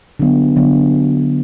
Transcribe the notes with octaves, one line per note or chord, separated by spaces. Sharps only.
D3 F#3 B3
D3 F#3 B3